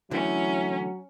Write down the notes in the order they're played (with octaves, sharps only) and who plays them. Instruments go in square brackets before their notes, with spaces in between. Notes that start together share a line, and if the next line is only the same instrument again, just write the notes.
[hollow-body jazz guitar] D3 E3 A3 [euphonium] F#3 [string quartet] C#4 [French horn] E4